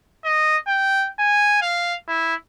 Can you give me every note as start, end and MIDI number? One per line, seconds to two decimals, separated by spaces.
0.24 0.58 75
0.67 1.09 79
1.19 1.60 80
1.61 1.97 77
2.08 2.35 64